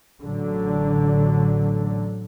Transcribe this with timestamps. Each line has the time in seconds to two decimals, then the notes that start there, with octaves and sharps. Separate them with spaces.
0.21 A1 D3 F#3